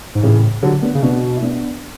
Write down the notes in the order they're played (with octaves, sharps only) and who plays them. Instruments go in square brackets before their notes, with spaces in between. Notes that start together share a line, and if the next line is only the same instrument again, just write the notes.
[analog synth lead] G#2
[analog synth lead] A2 [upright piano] C#3 E3
[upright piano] D3 F#3
B3 D4
[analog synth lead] C#3
[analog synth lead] B2 [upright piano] B3 D4
[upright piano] E4
B3 D4